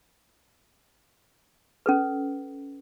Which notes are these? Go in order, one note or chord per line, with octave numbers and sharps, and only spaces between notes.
C#4 A4 B4